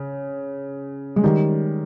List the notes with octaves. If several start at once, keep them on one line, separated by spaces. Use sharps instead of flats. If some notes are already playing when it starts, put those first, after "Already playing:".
Already playing: C#3
G#3
D#3 G3